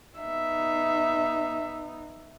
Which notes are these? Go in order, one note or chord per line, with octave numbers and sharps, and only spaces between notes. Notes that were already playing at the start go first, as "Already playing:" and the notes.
B3 D#4 E5